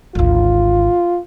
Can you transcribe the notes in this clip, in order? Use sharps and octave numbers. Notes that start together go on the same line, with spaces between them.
G#1 D2 F4